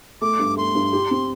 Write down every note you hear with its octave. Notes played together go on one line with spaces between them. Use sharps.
A3 D6
G2
A3 C6
G2
G4
C4